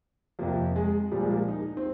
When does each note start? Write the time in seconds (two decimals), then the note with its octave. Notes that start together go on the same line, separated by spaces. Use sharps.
0.39 F2 C3 F3 A#3
0.76 G#3
1.12 A#2 F3 G3
1.21 G#3
1.30 A#3
1.48 D#4
1.77 C4